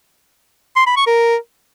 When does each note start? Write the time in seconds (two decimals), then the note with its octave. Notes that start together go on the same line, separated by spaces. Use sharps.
0.77 C6
0.87 B5
0.97 C#6
1.07 A#4